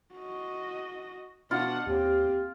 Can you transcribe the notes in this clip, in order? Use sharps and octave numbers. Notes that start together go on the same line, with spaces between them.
F#4 D#5
B2 D4 F4 F#5
D#2 C4 G4